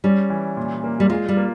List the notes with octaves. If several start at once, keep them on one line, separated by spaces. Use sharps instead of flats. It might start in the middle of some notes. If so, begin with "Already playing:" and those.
G3 C#4
E3
A#2
A#3
G3
G#3 F4
G3
A#3